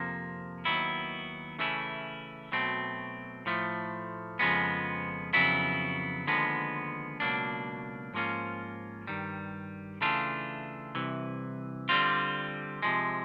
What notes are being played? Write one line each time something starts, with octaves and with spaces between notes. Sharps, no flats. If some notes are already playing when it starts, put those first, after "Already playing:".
Already playing: F2 C3 F3 A#3
D#2 D#3 F#3 B3 E4
C#3 E3 A3 C#4 E4
B2 F#3 A3 C4
A2 F3 A3
F2 C#3 F3 G#3 B3
F2 C#3 F#3 B3 E4
D#2 D3 F3 G#3 B3
C#2 B2 F#3 A#3 D4
G#2 F3 A#3 C#4 F4
G2 D#3 G3
C#3 E3 A3 D4 F4
C2 C3 E3
D3 G3 C4 F4
C3 F3 G#3